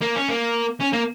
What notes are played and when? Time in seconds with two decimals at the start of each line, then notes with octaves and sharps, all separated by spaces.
0.02 A#3
0.16 C#4
0.29 A#3
0.80 C#4
0.93 A#3